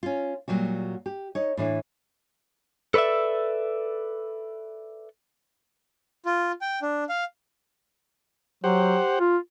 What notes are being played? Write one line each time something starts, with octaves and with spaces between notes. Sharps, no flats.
C#4 F4
A#2 F#3 G3 F#4
G4
D#4 C#5
A2 E3 D4 E4
A4 B4 C#5 D5 E5
F4
G5
D4
F5
F#3 G4 C5 F#5
F4